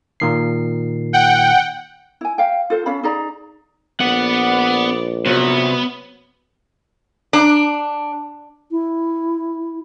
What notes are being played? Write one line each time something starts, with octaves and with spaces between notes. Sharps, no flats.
A#2 D#3 C7
F#5 G5
E4 G#5
E5 F5 G5
F4 A4 C5
C#4 A4 F5 B5
D#4 G#4 D5 A#5
A#1 B3 D5 F#5
C2 F#3 B3
D4
E4